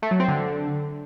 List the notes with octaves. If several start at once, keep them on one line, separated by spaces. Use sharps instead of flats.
A3
F#3
C4
D3